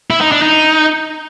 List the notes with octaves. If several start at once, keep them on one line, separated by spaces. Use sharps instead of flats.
E4
D#4
D4
D#4